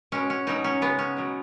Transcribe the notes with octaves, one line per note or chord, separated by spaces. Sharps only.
B2 G#3 C#4
C#4
B2 F#3 D#4
C#4
C#3 G#3 B3
C#4
B2 F#3